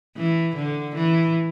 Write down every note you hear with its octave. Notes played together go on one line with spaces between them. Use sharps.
E3
D3
E3